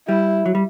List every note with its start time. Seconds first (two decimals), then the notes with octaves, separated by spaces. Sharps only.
0.08 G3 E4
0.46 F#3
0.55 G3